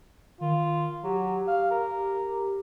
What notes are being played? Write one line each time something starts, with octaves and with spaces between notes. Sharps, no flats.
D#3 F4
F#3 G4
F5
A#4